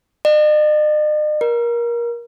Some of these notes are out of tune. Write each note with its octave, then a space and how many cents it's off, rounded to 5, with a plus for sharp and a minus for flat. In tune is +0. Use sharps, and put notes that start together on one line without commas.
D#5 -45
A#4 +20